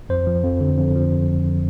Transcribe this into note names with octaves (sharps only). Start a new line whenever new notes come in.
F2 C5
F3
F2
D3
F2
F3